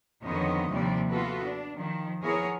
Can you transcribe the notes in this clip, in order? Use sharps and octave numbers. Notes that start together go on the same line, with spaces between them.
F2 D3 D#3 B3 C#5 D#5
D#2 C3 F3 G3 D5
B3 F4 F#4 A4 B4
D4
D#3 F3
F3 B3 E4 G#4 A#4 C#5